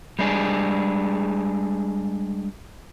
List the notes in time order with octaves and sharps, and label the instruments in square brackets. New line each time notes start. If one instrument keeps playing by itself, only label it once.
[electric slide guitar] G3 G#3 D4 G#4